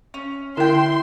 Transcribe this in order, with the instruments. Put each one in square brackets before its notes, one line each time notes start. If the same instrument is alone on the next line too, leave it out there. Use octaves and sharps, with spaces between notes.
[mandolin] C#4
[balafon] D3 E4 A#4 [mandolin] E5 G5 [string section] C6